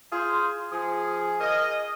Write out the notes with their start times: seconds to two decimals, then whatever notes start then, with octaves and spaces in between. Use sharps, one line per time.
0.12 F4 G#4 C5
0.72 F3 G#4
1.40 A#4 D#5